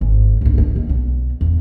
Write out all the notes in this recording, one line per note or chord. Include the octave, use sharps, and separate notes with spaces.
G#1
C2 G2
F3 G#3
D#2
B1
E2